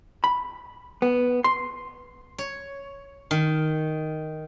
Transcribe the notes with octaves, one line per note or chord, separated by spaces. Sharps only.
B5
B3
C6
C#5
D#3